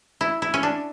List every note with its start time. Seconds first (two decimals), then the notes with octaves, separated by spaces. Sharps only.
0.21 E4
0.42 E4
0.54 C#4
0.63 D4